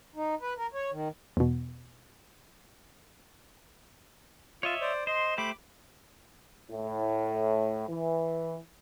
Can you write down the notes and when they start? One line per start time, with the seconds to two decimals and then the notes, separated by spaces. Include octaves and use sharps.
0.15 D#4
0.40 B4
0.57 A#4
0.73 C#5
0.91 D#3
1.37 E2 B2
4.63 F4 C#5 D#5 E5
4.81 C5 D5
5.07 C5 D#5 C6
5.38 A3 G4 C5 B5 D6
6.71 A2
7.89 E3